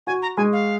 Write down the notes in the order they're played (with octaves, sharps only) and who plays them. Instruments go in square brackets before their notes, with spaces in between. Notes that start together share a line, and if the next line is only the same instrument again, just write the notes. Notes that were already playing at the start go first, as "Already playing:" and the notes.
[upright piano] F#4 [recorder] G#5
[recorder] A#5
[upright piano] G#3 [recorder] G#5
[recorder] F5